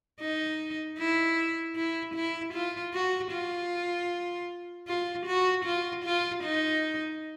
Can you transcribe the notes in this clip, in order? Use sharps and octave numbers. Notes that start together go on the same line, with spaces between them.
D#4
E4
E4
E4
F4
F#4
F4
F4
F#4
F4
F4
D#4